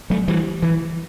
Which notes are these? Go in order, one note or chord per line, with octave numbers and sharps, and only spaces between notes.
F#3 A3
E3 G3
E3